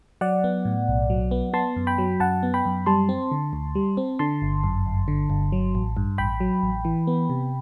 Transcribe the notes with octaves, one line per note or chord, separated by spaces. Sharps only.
F#3 D5 F#5
B3
A2
B1
F#3
B3
B3 A5 C6
F#2
G5 B5
F#3
F#2 F#5 A5
B3
G5 B5
F#2
G3 A5 C6
C4
D3
D2
G3
C4
D3 A5 C6
G1
F#2
G1
D3
G1
F#3
A1
G2
A1 G5 B5
F#3
A1
E3
B3
C3